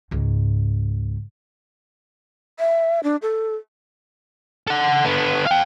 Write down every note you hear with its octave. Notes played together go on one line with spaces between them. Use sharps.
C#2 G#2
E5
D4
A4
A4 F#5
D3 B3
F5 G5